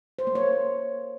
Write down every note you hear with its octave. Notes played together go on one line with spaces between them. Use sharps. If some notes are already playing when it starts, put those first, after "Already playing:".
C5
A#3
C#5